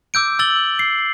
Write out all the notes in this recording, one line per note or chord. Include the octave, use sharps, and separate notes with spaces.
D6 E6 G6 D7
E6 A6 F#7 G7
C7